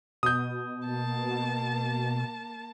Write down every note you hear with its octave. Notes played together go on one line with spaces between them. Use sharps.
B2 D#6 G6
A#3 A5